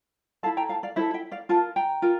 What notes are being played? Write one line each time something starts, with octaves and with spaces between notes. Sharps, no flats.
E4 A4 F5 A5
G5 A#5
F5 A5
D5 F5
E4 A4 C5 E5
E5 G5
D5 F5
F4 A#4 F5 A5
G5 A#5
F4 A#4